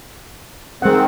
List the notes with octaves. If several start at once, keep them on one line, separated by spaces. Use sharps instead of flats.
D#3 G#3 C4 F#5